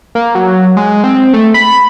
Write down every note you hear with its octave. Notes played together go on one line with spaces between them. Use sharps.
A#3
F#3
G#3
C4
A3
B5